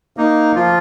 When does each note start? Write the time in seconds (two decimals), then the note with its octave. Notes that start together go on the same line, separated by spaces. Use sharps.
0.17 A#3 D#4
0.56 F3 F4